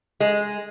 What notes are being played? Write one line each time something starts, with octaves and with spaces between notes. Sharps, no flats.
G#3